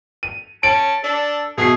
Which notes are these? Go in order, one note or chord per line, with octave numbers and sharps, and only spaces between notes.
D#7
C#4 A5 D7
D4 A4
B2 A3 G#4 C7